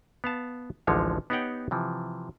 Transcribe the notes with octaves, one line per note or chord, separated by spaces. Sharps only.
B3 F5 A5
A1 D2 D3 F3 G#3 C#5
B3 D#4 G4 C#5 F#5 G5
C3 E3 F3